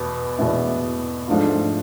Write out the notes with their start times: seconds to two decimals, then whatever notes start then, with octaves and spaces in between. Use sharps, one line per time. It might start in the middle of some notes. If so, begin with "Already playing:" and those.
Already playing: E2 B2 B3
0.39 E2 B2 B3 E4
1.28 G#2 F3 A3 D4 F4